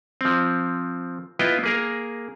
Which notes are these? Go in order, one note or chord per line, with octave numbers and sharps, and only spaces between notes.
F3 C4
B3 E4 F4 B4 D#5 G5
A#3 G#4 A#4